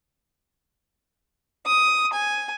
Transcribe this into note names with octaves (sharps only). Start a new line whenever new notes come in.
D#6
G#5